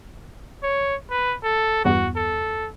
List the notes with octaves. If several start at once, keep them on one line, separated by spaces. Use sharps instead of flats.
C#5
B4
A4
E2 G2 B3 F#4
A4